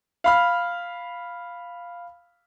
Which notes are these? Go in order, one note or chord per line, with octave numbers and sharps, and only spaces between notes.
F5 B5 F6